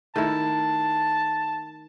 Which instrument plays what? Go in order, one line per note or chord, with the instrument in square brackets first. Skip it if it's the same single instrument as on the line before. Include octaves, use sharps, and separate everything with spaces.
[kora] D#3 A3 E4 [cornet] A5